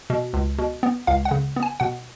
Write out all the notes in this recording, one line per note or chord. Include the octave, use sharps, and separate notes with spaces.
B2
C#2
B2
B3
C#2 F5
F#5
C#3
B3
G#5
B2 F#5